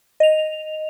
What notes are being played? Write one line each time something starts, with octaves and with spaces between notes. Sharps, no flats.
D#5 F7